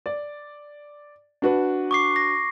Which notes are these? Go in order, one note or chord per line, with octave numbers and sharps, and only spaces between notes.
D5
D4 F#4 B4
C#6 D6 C7
A#6